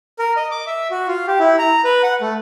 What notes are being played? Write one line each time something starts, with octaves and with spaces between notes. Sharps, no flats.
A#4
D#5
D6
E5
F#4
F4
G4
E4
A#5
B4
F#5
A3